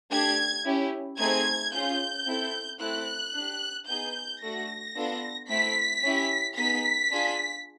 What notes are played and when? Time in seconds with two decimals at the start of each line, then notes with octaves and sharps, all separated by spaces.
0.11 A3 D4 G4 G#6
0.65 C#4 E4 G4
1.18 A3 C4 D#4 G#4 G#6
1.73 C#4 F4 G#4 G6
2.26 C4 E4 A4
2.80 A3 C4 E4 A4 F#6
3.34 D4 G4
3.88 B3 D#4 G#4 G6
4.41 A3 D4 F#4 A#6
4.95 B3 D4 F4 A4
5.49 A3 C4 E4 B6
6.03 C#4 E4 G4
6.57 B3 D#4 G#4 B6
7.11 D4 F4 G#4